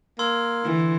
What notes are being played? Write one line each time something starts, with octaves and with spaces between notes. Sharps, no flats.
A#3 C6 E6 G#6
D3 E3